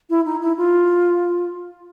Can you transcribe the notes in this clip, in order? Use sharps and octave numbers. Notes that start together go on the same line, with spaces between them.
E4
D#4
E4
F4